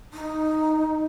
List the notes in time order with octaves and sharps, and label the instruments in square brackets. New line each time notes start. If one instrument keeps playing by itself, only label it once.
[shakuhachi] D#4